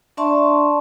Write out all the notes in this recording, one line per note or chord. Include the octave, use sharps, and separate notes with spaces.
D4 D5 E5 A5 C6 C#6